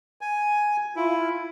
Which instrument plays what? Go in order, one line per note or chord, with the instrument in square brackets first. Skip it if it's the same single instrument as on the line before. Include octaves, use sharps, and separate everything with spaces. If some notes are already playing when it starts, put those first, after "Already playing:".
[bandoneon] G#5
[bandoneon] E4 [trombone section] F4